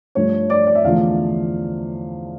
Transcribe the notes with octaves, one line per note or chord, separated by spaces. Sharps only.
G2 F3 A3 C#5
D5
D5
E5
E2 D3 F3 A3 F5